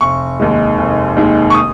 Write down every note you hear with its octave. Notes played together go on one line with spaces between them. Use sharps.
F1 C#6
D#2 D#3 G#3
F1
D#2 D#3 G#3
C#6
D#6